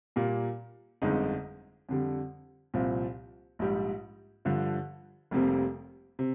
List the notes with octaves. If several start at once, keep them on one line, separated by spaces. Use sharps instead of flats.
A#2 G3 A#3
G1 F2 D3 G#3 D#4
F2 D3 G3
C2 A#2 F3 C4
A#1 G#2 G3
G2 D3 F3
F1 F2 C3 G3 A#3
C3